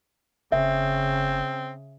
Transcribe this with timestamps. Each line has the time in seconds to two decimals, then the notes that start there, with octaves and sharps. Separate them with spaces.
0.52 F#1 C#3 C4 E5